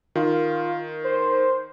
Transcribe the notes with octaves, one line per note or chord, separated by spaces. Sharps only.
D#3 F4
C5